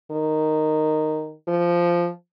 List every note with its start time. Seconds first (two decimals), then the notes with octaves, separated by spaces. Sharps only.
0.11 D#3
1.48 F3